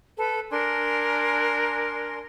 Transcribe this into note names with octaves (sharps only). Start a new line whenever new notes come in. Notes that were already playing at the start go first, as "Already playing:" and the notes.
A4 B4
D4 A#4 G#5 C6